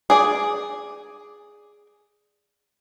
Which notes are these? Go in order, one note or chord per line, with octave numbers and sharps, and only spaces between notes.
G#4 D5